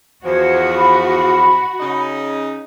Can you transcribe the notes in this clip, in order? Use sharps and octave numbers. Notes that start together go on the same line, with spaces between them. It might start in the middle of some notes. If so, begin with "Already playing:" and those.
E2 F3 F#4 C5 G#6
B5
C#3 D#4